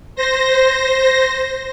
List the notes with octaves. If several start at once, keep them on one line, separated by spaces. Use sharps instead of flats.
C5 A#6